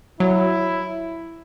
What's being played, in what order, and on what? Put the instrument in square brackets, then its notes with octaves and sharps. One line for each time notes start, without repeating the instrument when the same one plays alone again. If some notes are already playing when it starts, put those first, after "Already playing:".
[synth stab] F#3 [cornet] E4